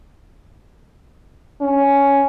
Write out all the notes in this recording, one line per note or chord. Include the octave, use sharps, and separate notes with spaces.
C#4